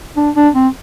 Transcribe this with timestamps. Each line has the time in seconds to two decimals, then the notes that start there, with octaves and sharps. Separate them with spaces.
0.16 D4
0.36 D4
0.54 C4